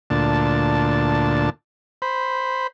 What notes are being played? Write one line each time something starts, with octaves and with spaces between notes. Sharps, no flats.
D2 A#2 D4 A5
C5 B5